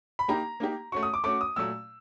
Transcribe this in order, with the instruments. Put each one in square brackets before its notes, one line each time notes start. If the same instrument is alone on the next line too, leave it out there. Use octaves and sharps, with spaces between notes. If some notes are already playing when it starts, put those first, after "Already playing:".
[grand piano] B5
[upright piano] A#3 D#4 G4 [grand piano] A#5
[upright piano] A#3 D#4 G4
[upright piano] A3 C#4 F#4 [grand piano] C#6
[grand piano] D#6
D6
[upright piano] A3 C#4 F#4 [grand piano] D6
[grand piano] D#6
[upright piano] A#2 F#3 A3 [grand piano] E6